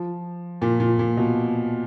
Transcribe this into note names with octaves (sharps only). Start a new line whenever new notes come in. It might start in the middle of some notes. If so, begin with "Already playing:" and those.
Already playing: F3
A#2
A#2
A#2
B2